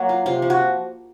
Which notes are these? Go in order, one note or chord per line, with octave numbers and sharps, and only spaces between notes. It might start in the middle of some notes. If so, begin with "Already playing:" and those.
Already playing: F#3 A#3 F#4
F4
C3 F4
F3
F#4